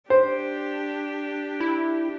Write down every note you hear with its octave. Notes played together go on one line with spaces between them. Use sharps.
D4 G4 C5
E4